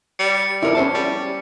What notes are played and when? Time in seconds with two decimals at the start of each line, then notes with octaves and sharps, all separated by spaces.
0.19 G3 C#7
0.62 F2 E4 A#4 D5
0.75 E2 C#4 C5 A5
0.94 G3